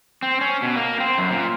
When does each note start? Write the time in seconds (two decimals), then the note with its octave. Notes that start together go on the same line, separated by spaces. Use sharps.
0.23 C4
0.41 C#4
0.62 B2
0.76 A#3
1.00 C4
1.18 F#2
1.31 A#2